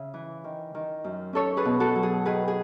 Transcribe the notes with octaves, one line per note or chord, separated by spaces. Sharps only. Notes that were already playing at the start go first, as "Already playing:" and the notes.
Already playing: C#3 E5
E3
D#3
D#3
F#2
C#4 A4 C#5
G#4 B4
B2
F#4 A4
F#3
G#4
D#3 G#4 B4
G#4